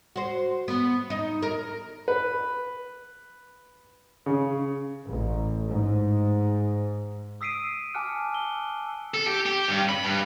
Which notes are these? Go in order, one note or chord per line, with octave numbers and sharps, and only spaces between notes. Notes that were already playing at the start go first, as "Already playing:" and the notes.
F#4 C5
B3
D#4
A#4
B4
C#3
A1
G#2
D#6 E6 B6 C7 D7 D#7
G#5 A5 D6 F6 F#6 C#7
E6 G7
A4
G4
G4
G2
B5
G2